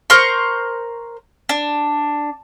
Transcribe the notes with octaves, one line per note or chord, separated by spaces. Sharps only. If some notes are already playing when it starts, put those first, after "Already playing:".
A#4 C5 A#5 C#6
D4